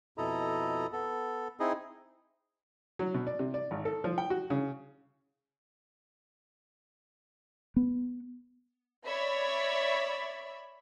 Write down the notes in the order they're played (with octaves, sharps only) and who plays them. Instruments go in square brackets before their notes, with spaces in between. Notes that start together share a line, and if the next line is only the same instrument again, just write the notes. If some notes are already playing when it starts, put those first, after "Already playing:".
[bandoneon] F2 B2 E4 A4 D#5 A#5
B3 A4
C4 D#4 E4 G#4 D#5
[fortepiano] F#3
B2
D5
C3
D5
G#1
A4
F3
G5
F#4
C#3
[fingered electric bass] B3
[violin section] C#5 D5 E5 B5